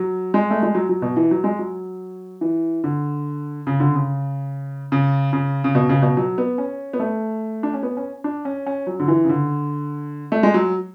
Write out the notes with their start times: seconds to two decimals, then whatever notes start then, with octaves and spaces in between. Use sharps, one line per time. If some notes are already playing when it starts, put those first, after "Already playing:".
Already playing: F#3
0.34 G#3
0.51 A3
0.63 G#3
0.75 F#3
0.89 F#3
1.02 B2
1.16 E3
1.31 F#3
1.44 G#3
1.59 F#3
2.41 E3
2.84 D3
3.67 C#3
3.80 D3
3.95 C#3
4.92 C#3
5.33 C#3
5.64 C#3
5.75 B2
5.89 C#3
6.02 B2
6.17 F#3
6.38 B3
6.58 C#4
6.93 B3
7.00 A3
7.63 D4
7.74 C#4
7.83 B3
7.97 C#4
8.24 D4
8.45 C#4
8.66 C#4
8.87 F#3
9.00 D3
9.08 E3
9.25 C#3
9.29 D3
10.32 A3
10.43 G#3
10.54 F#3